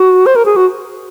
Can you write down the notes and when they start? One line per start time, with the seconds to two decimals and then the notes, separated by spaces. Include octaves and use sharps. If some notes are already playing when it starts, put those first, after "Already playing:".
Already playing: F#4
0.26 C5
0.36 A#4
0.46 G#4
0.56 F#4